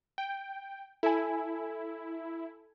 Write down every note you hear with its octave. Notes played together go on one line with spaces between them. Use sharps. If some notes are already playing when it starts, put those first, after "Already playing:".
G5
E4 A4 G#5